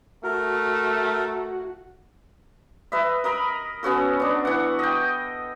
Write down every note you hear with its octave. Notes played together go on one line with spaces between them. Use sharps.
A3 F#4 A#4
B4 D#5 E5
A#4 D#5 B5
B3 C#4 F#4 A4
B3 D4
E3 F#5
D#5 G5